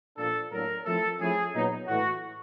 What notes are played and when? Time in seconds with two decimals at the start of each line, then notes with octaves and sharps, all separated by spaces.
0.17 A#2 F3 A#3 D4 A4
0.51 A2 F#3 A#3 D4 A#4
0.85 F3 A3 C4 E4 A4
1.20 F3 A3 C#4 E4 G#4
1.54 A#2 F#3 B3 D#4
1.87 A2 E3 A3 F#4